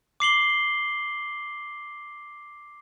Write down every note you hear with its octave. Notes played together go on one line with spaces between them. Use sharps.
D6 C7 F#7 G7